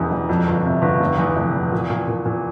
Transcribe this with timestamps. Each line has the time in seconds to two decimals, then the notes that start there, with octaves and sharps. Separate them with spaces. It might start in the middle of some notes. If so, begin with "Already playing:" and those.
Already playing: E1 E2 C#3
0.11 E1
0.29 F2
0.47 G1
0.65 C3
0.82 G1
1.00 F1
1.18 E2
1.36 F1
1.54 E2
1.72 A#2
1.90 A#2
2.08 A#2
2.25 A#2